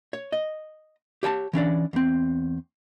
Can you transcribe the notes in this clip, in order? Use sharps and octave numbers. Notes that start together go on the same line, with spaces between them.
C#5
D#5
G4 C#5 G#5 A5
E3 C#4 D4 D5
E2 C4